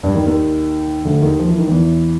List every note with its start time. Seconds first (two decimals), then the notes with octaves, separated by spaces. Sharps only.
0.03 G2 G3
0.15 D#2 D#3
0.26 D#2 D#3
1.05 D2 D3
1.22 D#2 D#3
1.39 F3
1.48 E3
1.58 D#3
1.67 E2 E3